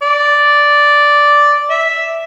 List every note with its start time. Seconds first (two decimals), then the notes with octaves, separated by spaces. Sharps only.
0.02 D5
1.70 E5